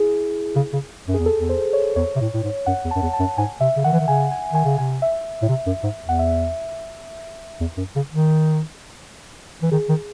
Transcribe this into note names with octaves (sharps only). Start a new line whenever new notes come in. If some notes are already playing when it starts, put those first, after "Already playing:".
Already playing: E4 G#4
C#3
C#3
F#2
E2 G#4
A4
E2
C5
C#5
E2 C#5
C3
A2
A2
G#2
F#2 F#5
E2
A5
F#2
E2
A5
F#2
G#2 G#5
C3 E5
C#3
D#3 F#5
E3
D#3
C#3 G#5
G#5
D#3 G#5
C#3
C3 G#5
E5
A2
C3
F#2
G#2
E2
F#5
E5
E2
F#2
C#3
D#3
E3
D#3 G#4
D#3